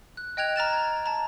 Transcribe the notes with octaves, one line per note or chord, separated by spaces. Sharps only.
F#6
D#5 G5 F#6 G#6 F7
A#5 F6 A6 E7
G#6
A5 A#5